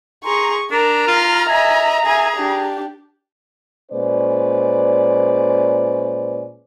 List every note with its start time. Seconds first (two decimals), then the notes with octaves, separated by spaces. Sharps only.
0.25 G#4 A#5 C6 C#6
0.71 D4 A#4 A#5
1.08 F4 F6
1.50 D#5 E5 G#5
2.06 G#4 E5 G#5
2.37 D4 G4
3.92 A#2 G#3 C#4 B4 C5 D5